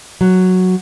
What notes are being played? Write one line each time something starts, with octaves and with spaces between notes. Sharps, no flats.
F#3